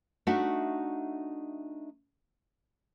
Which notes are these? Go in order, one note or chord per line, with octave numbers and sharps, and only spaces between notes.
A3 D4 D#4 F#4 E5 F#5